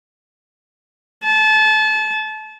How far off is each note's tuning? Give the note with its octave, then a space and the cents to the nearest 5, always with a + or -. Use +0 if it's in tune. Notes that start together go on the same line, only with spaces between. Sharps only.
A5 -30